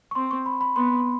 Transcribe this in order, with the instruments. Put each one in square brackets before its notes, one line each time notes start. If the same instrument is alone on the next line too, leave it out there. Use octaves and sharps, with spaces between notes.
[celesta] C#6
[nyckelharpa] C4 [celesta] C6
[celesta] C#6
B5
B5
[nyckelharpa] B3 [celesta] C6